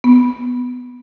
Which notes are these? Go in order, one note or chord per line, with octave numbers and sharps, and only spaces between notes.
B3